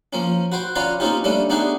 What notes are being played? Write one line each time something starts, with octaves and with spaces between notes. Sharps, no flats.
F3 A#3 C#4
F#4 B4 C5 G5
C#4 F4 B4 D5 F5 A#5
A#3 C4 C#4 D#4 F4 G4
G3 A3 A#3 C#4 D4
A3 B3 D4 D#4 G4 G#4